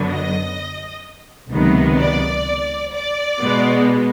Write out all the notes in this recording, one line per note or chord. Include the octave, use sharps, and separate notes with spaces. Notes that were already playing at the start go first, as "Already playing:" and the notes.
Already playing: F#2 D3 F#3 B3
D#5
C#2 C3 D#3 F#3 B3
D5
D5
B2 G#3 B3